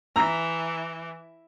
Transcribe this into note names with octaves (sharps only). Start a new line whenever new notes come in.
E3 A#5 E6